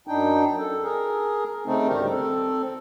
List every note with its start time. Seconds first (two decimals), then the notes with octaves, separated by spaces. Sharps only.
0.08 F#2 D4 D#4 G5
0.59 A4
0.83 G#4 A#4
1.66 C#3 A3 C4 D#4
1.89 D2 G#2 D#3 G3 G4 A#4
2.10 C4 A4